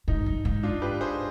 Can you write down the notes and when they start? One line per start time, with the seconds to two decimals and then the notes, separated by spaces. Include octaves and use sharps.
0.08 G#2 D#4
0.26 G2
0.45 G#2
0.63 D4 F4
0.82 G4 B4
1.01 G#4 C5